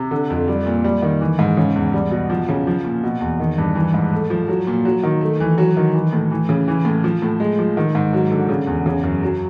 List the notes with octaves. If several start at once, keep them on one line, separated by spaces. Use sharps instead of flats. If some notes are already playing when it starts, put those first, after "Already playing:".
Already playing: C3
D3
F2
G3
A#2
G3
D#3
E3
G#2
C#3
E2
G3
B2
F3
C#3
F3
A#2
B2
E2
D#3
G2
E3
G#2
A3
F3
F#3
A#2
F#3
D#3
A3
E3
F#3
D#3
E3
A2
E3
C#3
E3
A2
F3
A2
G#3
F3
D#3
G#2
F#3
D3
C#3
E2
C#3
F#2
F#3